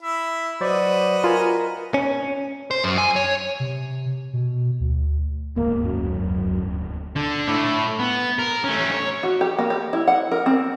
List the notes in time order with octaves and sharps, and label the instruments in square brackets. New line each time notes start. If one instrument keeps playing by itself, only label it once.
[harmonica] E4 E5
[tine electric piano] F#3 C5 D5 [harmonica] F#4 B4 D#5
[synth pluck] F4 [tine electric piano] A#4 G#5 A#5
[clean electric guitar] C#4
[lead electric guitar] C5
F#2
G#5
C#5
[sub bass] C3
B2
D2
[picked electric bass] D#1 D2 G#2 [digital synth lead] A#3
[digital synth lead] F#2
[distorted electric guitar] D3
A3 E4
B3
A#4
A3 C#4
C#5
[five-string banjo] F#4
G4
A#3
G4
E4
F#5
A#4
C4